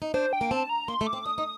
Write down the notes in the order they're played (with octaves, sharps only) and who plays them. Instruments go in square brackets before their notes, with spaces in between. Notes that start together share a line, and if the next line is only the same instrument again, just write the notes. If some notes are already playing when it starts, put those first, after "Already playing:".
[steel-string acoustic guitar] D#4
[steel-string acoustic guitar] D4 [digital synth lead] C5
[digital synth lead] G5
[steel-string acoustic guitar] A#3
[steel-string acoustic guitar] C4 [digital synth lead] A5
[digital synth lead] A#5
[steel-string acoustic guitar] A#3 [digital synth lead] C6
[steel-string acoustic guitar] A3
[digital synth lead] D6
[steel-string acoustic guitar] C4
[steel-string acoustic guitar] D4 [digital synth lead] D#6
[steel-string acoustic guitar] D#4